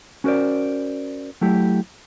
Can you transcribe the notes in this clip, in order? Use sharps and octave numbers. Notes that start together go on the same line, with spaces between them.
C#4 F#4 A#4 C5 D5
F#3 A3 E4 G4